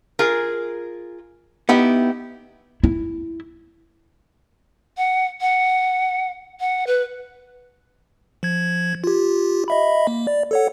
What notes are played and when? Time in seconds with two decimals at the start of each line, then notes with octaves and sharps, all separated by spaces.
0.19 F4 G#4 A#4
1.69 B3 D#4 E4 G4
2.84 E4
4.97 F#5
5.41 F#5
6.60 F#5
6.87 B4
8.43 F3 G#6
9.04 F4 G4
9.68 D#5 E5 B5
10.07 A#3
10.27 D5
10.51 A4 C#5 F#5